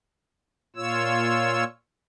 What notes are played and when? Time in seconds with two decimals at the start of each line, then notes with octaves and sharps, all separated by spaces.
0.76 A#2 F4 C#5 E6